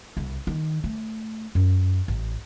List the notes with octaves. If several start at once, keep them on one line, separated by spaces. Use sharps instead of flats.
C2
D#3
A3
F#2
A1